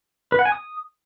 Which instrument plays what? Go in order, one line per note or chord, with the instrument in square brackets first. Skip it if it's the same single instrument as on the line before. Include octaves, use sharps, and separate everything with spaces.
[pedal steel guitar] B4
F#5
G#5
D#6